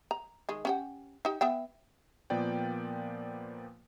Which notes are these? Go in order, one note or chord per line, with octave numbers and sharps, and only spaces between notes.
A#5
D#3 G#3
C#4 G4 F#5
D#4 G4
B3 E5 G5
A#2 F3 A#3 B3 D5 G5